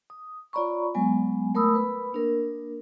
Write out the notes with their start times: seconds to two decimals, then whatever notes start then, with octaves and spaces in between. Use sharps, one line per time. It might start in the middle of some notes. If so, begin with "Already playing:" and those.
0.10 D#6
0.53 F4 C#5 D5 A#5 B5 C#6
0.95 F#3 G#3 B3 G#5
1.55 A3 A#4 B5 D#6 E6
1.75 B4 B5
2.13 A#3 D4 A#4